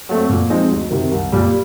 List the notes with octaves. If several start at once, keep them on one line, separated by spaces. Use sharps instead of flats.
F#3 A3 C4
A#2
F3 G#3 C4 D#4
D2
C3 D#3
C2
A#2 G3